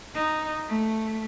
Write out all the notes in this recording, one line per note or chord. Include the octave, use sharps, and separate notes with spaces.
D#4
A3